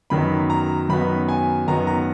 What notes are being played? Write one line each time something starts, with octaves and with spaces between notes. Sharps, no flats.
F#2 D#3 F#3 B3 B5
A#5
F#2 D#3 F#3 B3 B5
G#5
F#2 D#3 F#3 B3 A#5
A#5